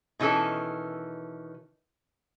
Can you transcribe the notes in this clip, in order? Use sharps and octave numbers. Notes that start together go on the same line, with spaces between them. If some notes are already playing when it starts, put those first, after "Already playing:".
B2 D#3 E3 C#4 A4